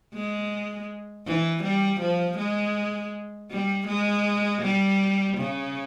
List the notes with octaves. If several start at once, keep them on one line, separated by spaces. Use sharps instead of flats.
G#3
E3
G3
F3
G#3
G3
G#3
G3
C#3